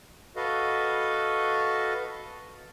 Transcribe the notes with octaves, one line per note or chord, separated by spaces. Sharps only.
F#4 A4 B4 D#5 F5